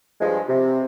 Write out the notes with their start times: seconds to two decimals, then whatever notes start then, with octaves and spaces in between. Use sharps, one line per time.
0.20 G2 F3 G#3
0.48 C3